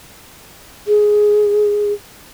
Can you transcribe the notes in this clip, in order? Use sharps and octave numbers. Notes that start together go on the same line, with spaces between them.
G#4